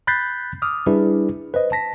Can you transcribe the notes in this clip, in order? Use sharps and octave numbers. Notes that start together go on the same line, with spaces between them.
B5 F#6 G6 A6 B6 C7
D6 D#6 F6
G3 D4 E4 G#4 B4
B4 C5 D#5
A5 A#6 B6